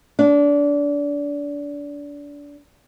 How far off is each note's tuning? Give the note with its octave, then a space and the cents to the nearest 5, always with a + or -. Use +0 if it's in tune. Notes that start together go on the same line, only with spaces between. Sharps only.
D4 -25